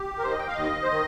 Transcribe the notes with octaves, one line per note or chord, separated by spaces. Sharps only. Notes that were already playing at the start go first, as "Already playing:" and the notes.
Already playing: G4
A#4
D#2 D#3 C5
D#5
G5
F5
D#2 D#3 D#5
C5
D#3 D#5